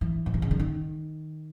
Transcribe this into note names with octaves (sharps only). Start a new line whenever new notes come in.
E3
B2
C3
C#3
D3
D#3